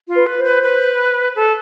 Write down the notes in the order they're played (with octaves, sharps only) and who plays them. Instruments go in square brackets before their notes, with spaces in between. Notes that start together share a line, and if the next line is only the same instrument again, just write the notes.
[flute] F4
[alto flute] B4
[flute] B4
[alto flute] C5
[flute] B4
B4
A4